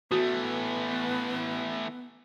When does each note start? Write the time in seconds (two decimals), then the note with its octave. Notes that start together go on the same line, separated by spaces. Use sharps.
0.12 E3 A3 B3 F#4